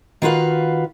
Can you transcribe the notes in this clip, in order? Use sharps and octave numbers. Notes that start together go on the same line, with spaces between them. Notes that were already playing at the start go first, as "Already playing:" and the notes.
D#3 F4 F#4 B4 F5